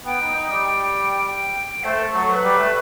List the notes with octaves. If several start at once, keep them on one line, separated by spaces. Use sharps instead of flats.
B3 G5
D#4
D#4
G3
G5
A3 C5
A4
F#3 A4
C5
B4
G3
A3